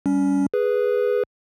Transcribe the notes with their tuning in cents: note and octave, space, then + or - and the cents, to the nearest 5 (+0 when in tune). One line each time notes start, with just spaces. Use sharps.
G3 +0 C#4 +20
G#4 +0 B4 +0